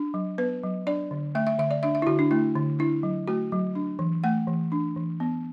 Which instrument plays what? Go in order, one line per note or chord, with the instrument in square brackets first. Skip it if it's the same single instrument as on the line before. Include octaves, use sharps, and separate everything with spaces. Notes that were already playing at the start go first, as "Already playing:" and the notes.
Already playing: [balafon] D4
F#3
B3 B4
F#3
D4 D5
D3
A3 E5
E5
D3 E5
D5
D4 E5
E5
E4
D3 F#4
D4
A3 E4
D3
D4 E4
F#3
A3 F#4
F#3
D4
E3
A3 F#5
E3
D4
E3
B3